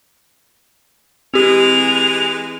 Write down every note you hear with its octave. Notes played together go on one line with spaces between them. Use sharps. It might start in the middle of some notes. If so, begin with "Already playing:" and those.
E3 G#3 C4 G4 F7